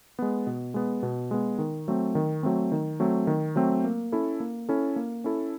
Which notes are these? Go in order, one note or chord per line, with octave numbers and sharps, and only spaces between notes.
G#3 B3
B2
G#3 B3
B2
G#3 B3
D#3
F#3 A3 C4
D#3
F#3 A3 C4
D#3
F#3 A3 C4
D#3
F#3 A3 C4
A#3
C#4 E4 A4
A#3
C#4 E4 A4
A#3
C#4 E4 A4